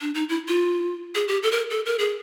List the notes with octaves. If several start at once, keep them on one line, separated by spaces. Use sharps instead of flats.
D4
D#4
E4
F4
G#4
G4
A4
A#4
A4
A#4
G#4